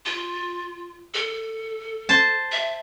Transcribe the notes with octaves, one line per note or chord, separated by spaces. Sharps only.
F4
A4
C5 A5
E5